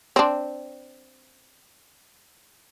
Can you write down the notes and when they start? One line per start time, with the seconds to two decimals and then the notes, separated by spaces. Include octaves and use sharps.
0.16 C4 D4